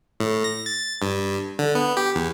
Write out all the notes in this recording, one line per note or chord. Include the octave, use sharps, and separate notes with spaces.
A2
A#6
A6
G2
D3
B3
G4
E2